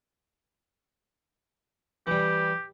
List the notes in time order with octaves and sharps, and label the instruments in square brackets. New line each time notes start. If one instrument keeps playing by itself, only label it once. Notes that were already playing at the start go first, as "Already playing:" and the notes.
[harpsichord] E3 G3 [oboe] G4